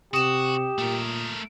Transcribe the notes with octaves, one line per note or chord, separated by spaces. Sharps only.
C3 F#4 G4 D#6 E7
A#2 A3 A#4